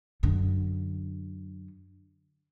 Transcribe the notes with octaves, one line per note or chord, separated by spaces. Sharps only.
F#2 D3